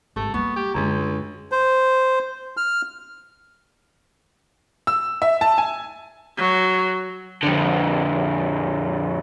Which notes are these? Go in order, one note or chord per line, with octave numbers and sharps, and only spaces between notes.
G#1 G2 A3
G3 A#3 B3 C#6
G4
C#2 F#2 D3 G#3 D4
C5
F6
E6
E5
A5
G#5
F#3
F2 D3